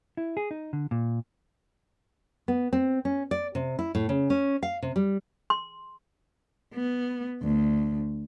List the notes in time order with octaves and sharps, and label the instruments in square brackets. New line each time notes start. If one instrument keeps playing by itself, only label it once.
[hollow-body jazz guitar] E4
G#4
D#4
D3
A#2
[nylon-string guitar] B3
C4
C#4
D5
C3
E4
A2
C#3
C#4
F5
C3
G3
[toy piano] C6
[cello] B3
D2